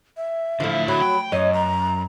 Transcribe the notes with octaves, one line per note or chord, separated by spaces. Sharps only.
E5
D3 F3 A3 E4
F#3 B5
G5
F#2 C#5 D#5
A#5